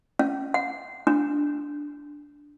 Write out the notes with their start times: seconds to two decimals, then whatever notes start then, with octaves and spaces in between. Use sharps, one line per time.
0.19 C#4
0.54 F#5
1.07 D4